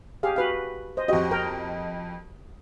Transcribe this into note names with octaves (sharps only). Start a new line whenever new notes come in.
G4 G#4 F5
F#4 B4 F5
C5 D#5
F2 F#4 G4 D#5
A#4 G5